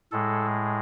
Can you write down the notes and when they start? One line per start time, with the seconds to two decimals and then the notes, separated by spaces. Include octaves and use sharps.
0.12 A2 G#3 A4